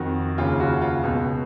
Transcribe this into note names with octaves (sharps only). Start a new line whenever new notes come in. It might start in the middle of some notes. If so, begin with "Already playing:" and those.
Already playing: F2 D#3 F#4
D#2 C#3 F4
F#4
F4
C#2 B2